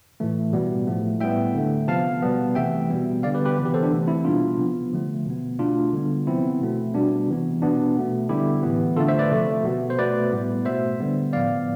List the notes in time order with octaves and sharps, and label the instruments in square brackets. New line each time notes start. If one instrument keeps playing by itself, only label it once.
[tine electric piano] A2 E3 A3
B2 G3 B3
A2 F3 A3
A2 G3 B3 E5 G5
D3 A3
C3 F3 B3 F5 A5
B2 G3 B3
C3 E3 A3 E5 G5
B2 G3 B3
D3 G3 B3 D5 F5
G4 B4
G4 B4
C3 E3 B3
G4 B4
A4 C5
D4
C3 E3 A3
C4 E4
B2 G3 B3 D4 F4
C3 F3 B3
D3 F3 A3
B2 B3
B2 A3 D4 F4
D3 G3 B3
C3 F3 B3 C4 E4
B2 A3
B2 G3 B3 D4
C3 E3 B3
B2 B3 D4
B2 A3
D3 G3 B3 E4 G4
A2 E3 B3
D3 A3 F4 A4
C5 E5
B4 D5
C3 F3 A3
B2 B3
C5
B2 A3 B4 D5
A2 G3 B3
B2 A3 C5 E5
D3 G3 B3
A2 F3 B3 D5 F5